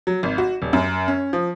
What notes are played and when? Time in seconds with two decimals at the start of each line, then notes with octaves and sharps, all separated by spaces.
0.07 F#3
0.23 G#1
0.38 F#4
0.62 D#1
0.73 F#2
1.08 C#4
1.33 F3